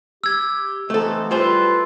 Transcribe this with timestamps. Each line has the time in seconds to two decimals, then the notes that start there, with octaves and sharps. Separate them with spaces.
0.24 G4 E6 G#6
0.90 E3 A3 B3 C4 D#4 A4
1.31 G3 E4 F4 G#4 A4 B4 C5